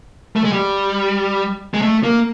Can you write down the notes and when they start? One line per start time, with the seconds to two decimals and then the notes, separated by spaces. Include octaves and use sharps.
0.36 A3
0.44 G#3
0.53 G3
1.74 G#3
1.82 A3
2.03 A#3